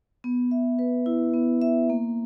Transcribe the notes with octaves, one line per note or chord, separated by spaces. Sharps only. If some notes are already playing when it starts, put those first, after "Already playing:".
B3
E5
B4
E4
B3
E5
A#3